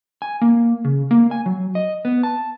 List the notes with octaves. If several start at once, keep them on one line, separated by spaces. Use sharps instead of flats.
G#5
A#3
C#3
A#3
G#5
F#3
D#5
B3
A5